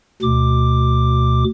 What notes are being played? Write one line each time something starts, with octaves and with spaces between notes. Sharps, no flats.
D2 B2 D6